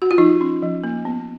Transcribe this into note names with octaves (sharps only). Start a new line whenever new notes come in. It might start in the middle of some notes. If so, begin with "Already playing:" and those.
F#4
F4
F3 D#4
C#4
F3
A#3
B3